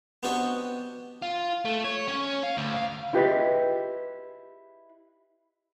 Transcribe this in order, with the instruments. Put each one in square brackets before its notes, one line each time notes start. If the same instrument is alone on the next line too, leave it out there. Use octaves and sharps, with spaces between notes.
[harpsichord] B3 C4 D4 F#4 G4 D#5
[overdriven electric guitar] F4
A3
C#5
C#4
F5
D2
F5
[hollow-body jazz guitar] E4 F4 G4 G#4 B4 D#5